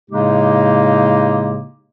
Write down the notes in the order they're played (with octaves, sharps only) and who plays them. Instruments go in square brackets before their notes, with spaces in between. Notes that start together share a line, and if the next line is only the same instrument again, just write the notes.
[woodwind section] A2 C#3 G#3 A#3 D#4 G4